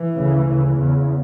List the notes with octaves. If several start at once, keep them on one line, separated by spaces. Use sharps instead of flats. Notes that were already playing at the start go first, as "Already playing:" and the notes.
Already playing: E3
D2 C#3
D2 C#3
E2 C#3